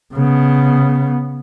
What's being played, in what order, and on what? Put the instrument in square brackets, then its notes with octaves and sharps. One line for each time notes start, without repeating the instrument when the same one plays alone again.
[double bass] C#3 B3